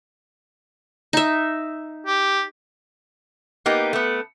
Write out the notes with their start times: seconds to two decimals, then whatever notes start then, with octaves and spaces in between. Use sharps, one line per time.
1.13 D#4 E5
2.06 G4
3.66 A#3 B3 D#4 G4
3.93 A3 B3